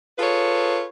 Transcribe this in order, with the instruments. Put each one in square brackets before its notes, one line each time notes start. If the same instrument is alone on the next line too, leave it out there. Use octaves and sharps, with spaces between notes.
[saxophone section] F4 G#4 A4 B4 C#5